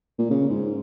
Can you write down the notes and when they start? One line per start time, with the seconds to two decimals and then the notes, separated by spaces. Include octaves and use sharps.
0.19 A#2
0.30 C#3
0.50 G#2